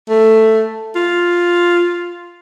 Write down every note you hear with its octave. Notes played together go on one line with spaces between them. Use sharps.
A3
F4